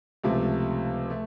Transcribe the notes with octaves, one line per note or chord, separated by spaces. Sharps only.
C#2 C3 F3 A3
A3